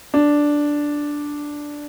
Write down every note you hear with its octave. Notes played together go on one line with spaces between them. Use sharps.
D4